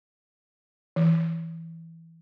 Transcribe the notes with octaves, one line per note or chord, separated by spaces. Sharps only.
E3